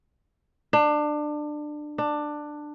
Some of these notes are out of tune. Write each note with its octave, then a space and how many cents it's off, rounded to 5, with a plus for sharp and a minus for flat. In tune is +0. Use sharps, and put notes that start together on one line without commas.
D4 +25
D4 +15